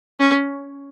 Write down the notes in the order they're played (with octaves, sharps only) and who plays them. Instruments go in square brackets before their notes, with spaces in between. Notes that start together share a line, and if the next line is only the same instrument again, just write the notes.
[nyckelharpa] C#4